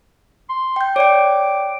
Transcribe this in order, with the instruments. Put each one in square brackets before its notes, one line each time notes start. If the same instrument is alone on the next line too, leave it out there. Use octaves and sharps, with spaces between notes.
[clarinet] C6
[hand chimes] G5 G6
[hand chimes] C#5 D5 G5 [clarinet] D6